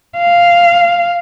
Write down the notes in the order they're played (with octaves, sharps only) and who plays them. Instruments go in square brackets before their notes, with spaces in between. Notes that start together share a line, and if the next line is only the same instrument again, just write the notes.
[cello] F5